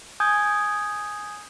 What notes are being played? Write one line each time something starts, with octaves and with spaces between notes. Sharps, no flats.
G#5 D#6 G6 G#6